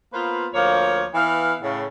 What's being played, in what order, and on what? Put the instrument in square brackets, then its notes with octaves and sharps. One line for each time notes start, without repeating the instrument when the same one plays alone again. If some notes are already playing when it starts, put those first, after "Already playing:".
[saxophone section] A#3 B3 F4 B4 C5
D2 F3 A#3 C#5
E3 B3 F5
A2 C#3